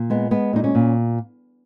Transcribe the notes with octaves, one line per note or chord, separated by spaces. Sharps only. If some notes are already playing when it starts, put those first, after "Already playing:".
Already playing: A#2
G#3 B3
G#3 B3
A#2 D#4
C#4
A#2